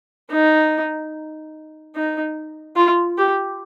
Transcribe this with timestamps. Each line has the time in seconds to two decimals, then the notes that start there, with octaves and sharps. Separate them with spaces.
0.31 D#4
1.95 D#4
2.76 F4
3.18 G4